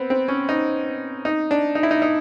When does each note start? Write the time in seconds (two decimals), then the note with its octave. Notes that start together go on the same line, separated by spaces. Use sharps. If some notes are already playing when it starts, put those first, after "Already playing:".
Already playing: B3 C4
0.10 C4
0.28 C#4
0.49 D#4
1.25 D#4
1.51 D4
1.75 D#4
1.83 E4
1.91 D#4
2.02 D#4